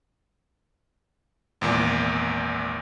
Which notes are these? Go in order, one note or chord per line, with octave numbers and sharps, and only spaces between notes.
G#1 E2 A#2